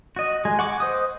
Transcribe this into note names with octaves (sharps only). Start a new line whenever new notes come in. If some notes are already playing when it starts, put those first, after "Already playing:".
F#4 D#5
G#3
F#5 C#6 D6
C5 D#5 D#6